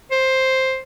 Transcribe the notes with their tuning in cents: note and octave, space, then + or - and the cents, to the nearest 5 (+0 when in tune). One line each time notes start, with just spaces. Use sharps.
C5 +5